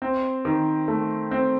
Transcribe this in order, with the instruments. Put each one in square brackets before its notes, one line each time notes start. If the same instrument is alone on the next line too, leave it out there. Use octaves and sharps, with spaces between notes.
[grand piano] C4
D#3
A3
C4